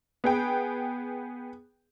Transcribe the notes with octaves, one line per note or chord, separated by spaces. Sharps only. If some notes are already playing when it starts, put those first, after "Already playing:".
B3 G#4 G5